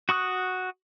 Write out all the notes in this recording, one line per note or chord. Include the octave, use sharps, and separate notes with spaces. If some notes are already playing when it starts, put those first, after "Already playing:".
F#4 C#6 D#6 F#6